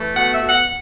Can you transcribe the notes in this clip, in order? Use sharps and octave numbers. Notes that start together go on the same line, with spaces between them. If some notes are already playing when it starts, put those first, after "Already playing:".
Already playing: E3 A3
B2 F#5
E5
B2
F#5